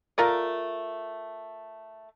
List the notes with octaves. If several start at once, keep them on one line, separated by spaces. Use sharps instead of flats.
A3 F4 A#4 D5